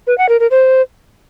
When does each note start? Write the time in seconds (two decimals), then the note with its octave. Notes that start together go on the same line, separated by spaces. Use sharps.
0.07 B4
0.18 F#5
0.29 A#4
0.40 A#4
0.51 C5